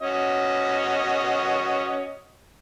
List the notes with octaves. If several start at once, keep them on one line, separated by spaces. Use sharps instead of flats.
C#4 F#4 D#5